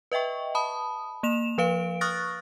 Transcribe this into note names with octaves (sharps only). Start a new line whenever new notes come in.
B4 D#5 E5 G5 C#6
A5 B5 D#6
A#3 E7 F7
F3 B4 F5 D7
C#6 D#6 F6 F#6 A6 A#6